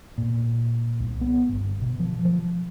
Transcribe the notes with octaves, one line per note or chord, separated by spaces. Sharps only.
A#2
C2
B3
G1
B2
F3
F3